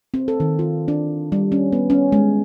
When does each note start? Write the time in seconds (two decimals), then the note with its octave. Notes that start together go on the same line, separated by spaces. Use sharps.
0.14 C4
0.28 A4
0.40 D#3
0.59 F4
0.88 D4
1.32 G3
1.52 C#4
1.73 B3
1.90 C#4
2.12 G#3